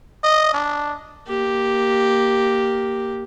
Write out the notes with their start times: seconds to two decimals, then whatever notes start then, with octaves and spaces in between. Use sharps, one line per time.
0.23 D#5
0.53 D4
1.27 A#3 G4